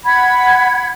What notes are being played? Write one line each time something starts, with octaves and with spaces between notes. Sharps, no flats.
F#5 B5 G#6